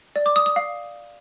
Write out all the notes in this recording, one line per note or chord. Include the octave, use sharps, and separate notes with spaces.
D5
D6
D#6
D#6
F5